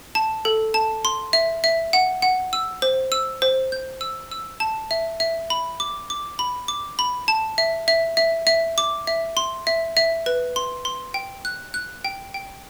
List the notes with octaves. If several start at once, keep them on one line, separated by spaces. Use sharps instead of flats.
A5
A4
A5
C6
E5
E5
F#5
F#5
E6
C5
E6
C5
G6
E6
E6
A5
E5
E5
B5
D6
D6
B5
D6
B5
A5
E5
E5
E5
E5
D6
E5
C6
E5
E5
B4
C6
C6
G5
F#6
F#6
G5
G5